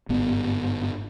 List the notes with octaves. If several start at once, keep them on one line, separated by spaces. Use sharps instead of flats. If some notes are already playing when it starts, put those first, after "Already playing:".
G1 G#2 B3